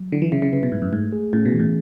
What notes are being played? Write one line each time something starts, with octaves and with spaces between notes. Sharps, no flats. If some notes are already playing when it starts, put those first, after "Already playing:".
Already playing: F#3
D3 E4
E3
C#3 E5
C#3
C#3 B4
B2
G#2 A3
F#2
G#2 A3
G#4
A2 C#4
B2
E3
A2